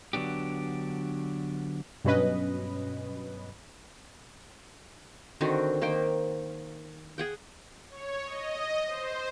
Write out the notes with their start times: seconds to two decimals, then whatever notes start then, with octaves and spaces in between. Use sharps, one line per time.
0.13 D3 F#3 B3 D4 G4
2.04 G2 B2 F#3 C#4 B4 D#5
5.41 D3 D#3 C4 F#4
5.81 D#3 A#3 C5 G5
7.18 G#4 F#5 G5
7.89 C#5
8.25 D#5
8.86 C5